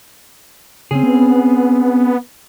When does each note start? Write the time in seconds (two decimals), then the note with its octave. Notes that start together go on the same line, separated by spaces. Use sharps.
0.91 C#3 C4 C#4 G#4
1.03 B3